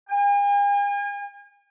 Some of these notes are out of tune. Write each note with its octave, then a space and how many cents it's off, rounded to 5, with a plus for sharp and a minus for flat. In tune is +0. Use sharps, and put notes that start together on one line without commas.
G#5 -45